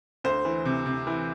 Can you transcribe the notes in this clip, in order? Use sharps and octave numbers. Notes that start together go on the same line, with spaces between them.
D2 C5
E3
C3
C3
E3